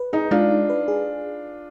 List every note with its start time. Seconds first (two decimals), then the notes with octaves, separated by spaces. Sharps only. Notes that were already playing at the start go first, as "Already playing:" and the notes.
Already playing: B4
0.13 D#4 G#4
0.31 G#3 D4 F4
0.51 D#4
0.70 B4
0.88 G#4